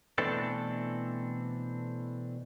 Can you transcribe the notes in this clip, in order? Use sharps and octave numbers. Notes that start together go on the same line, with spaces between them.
B2 E3 A3 C4 D4 A4